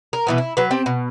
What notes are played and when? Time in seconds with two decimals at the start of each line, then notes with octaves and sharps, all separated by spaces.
0.13 A#4
0.27 B2 E3 B3
0.38 E4
0.57 F#3 B4
0.71 C4 G4 A5
0.86 B2